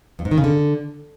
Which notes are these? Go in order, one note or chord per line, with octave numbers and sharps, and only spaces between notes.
F2
G#2
D#3
C#3
D3